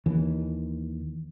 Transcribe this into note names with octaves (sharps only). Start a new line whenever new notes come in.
D#2 E3